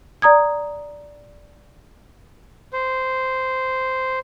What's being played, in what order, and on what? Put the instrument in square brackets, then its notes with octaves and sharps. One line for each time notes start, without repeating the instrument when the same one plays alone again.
[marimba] D5 A#5 D#6 G#6
[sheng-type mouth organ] C5